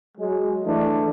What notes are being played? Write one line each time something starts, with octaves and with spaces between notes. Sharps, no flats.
F#3 G#3
E3 A3 D4